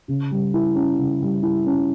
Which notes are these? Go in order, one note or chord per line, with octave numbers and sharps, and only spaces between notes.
C#3
G3
E4
C#4
C#3
G3
E4
C#4